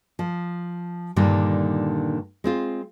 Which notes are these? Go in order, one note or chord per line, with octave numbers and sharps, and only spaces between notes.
F3
G2 A#2 D3 D#3 G3
G#3 C4 F4